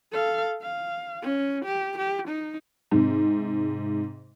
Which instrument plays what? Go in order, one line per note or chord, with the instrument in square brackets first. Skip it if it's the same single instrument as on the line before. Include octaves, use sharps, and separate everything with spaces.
[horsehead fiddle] A4 F5
F5
C#4
G4
G4
D#4
[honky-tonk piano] G#2 C3